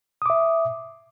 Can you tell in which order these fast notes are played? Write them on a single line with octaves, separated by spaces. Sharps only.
D#6 D6 E5